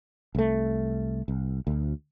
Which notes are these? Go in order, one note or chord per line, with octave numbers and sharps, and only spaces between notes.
C2 A3
C2
D2